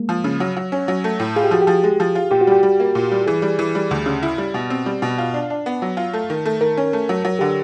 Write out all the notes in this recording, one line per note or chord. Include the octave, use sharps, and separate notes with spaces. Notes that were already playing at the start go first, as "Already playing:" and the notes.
Already playing: G#3 A#3
F3
C#3
F#3
F#3
C#4
F#3
A3
A2
F4 G#4
G4
F3 F#4
G4
F3
G#3
F3
F4
A#2 G4
F#4
G3 G4
G3
A#3
A#2
G3
E3 G#4
G3
E3
G3
D2
C#3
E4
G3
B2
C4
G3
B2
F4
D4
D4
B3
F#3
F4
A3
D#3
A3
D#3 A#4
C#4
A3
F#3
F#3
D3 G4